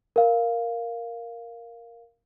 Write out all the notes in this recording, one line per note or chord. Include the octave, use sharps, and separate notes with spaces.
A#4 F5